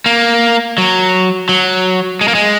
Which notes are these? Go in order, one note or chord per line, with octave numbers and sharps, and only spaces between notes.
A#3
F#3
F#3
G#3
A#3
G#3